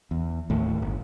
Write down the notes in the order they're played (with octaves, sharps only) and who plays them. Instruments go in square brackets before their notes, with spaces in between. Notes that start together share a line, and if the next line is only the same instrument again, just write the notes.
[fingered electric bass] E2
D1 D#2 A2
G1